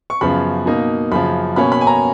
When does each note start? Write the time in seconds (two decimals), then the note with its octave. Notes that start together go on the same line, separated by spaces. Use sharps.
0.10 C#6
0.21 F#2 C#3 F3 B3 B5
0.66 B2 A#3 D#4
1.12 F#2 C#3 F3 B5
1.56 B2 A#3 C#4 B5
1.72 B5
1.81 G#5
1.87 A#5